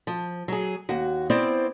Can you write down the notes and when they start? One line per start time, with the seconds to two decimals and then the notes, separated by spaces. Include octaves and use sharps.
0.07 F3
0.48 F#3 G#4
0.89 D#2 F#4
1.30 B3 C4 E4 C5 D5